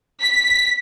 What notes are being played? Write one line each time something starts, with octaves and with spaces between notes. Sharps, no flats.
B6